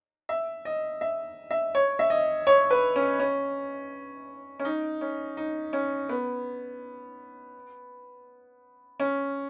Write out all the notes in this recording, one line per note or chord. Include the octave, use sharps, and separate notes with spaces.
E5
D#5
E5
E5
C#5
E5
D#5
C#5
B4
C#4
C#4
C#4
D#4
C#4
D#4
C#4
B3
C#4